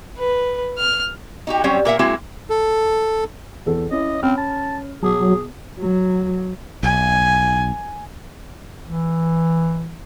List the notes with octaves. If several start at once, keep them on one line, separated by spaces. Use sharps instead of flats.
B4
F6
D#4 F#4 G4
F#3 G3 C4 C#4
A#2 A#4 E5 F#5
G#3 A#3 C4 E4 F#4
A4
E2 A4
C#4 E4 D#5
C4 C#4 B5 F6
A5
B2 F#3 G#4 A5
F#3
B1 G#5
E3